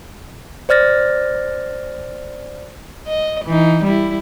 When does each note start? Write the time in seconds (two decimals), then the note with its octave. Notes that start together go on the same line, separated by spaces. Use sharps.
0.69 C5 D5 F6 A6 A#6
3.07 D#5
3.45 E3 D#4
3.83 G3 E4